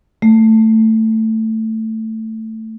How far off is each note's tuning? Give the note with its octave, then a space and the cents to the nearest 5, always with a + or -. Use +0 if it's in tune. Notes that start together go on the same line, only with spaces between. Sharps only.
A3 +10